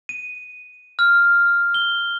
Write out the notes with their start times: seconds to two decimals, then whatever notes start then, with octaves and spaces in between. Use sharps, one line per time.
0.09 D#7
0.99 F6
1.74 G7